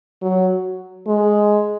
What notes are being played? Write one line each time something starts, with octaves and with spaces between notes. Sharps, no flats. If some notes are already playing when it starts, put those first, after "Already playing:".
F#3
G#3